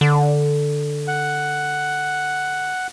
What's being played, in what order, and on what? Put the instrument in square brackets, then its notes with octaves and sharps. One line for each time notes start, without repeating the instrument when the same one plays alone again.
[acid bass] D3
[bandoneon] F#5